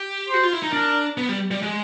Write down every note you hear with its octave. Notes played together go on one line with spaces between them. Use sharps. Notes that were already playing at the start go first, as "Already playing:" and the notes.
Already playing: G4
F#4 C5
F4
E4
D#4
D4 A#4
B3
G3
G3
G#3